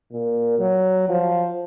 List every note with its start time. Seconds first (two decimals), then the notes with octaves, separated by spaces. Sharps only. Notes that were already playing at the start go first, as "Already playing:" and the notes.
0.12 A#2
0.59 F#3
1.09 F3